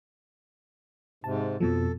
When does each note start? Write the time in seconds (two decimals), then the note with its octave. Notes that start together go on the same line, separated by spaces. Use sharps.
1.24 G#2 C3 A5
1.60 F2 B2 F3 A4